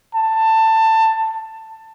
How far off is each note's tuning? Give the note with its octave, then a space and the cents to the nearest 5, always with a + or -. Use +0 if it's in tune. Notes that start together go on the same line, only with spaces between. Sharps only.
A5 +15